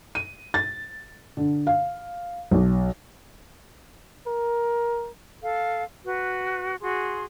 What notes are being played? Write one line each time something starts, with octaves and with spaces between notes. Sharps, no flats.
D#7
A6
D3
F5
B1
A#4
A4 F5
F#4 B4
F#4 G#4 C6